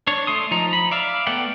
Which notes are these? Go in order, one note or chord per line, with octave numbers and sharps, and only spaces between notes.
D4 C#5
A3 C6 D#6
F3 D#4 A#5
B5
D5 E5 F5
A3 B3 D5 F#5 G5